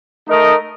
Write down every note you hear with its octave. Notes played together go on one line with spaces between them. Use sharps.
A3 D#4 A#4 D#5